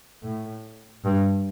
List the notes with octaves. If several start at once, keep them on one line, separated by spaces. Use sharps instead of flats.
A2
G2